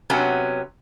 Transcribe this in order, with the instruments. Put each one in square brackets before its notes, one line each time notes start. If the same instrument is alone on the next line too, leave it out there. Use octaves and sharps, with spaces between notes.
[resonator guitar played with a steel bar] C3 F#3 B3 C#4